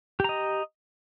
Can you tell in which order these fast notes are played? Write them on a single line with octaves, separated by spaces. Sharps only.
G4 A#5 D#5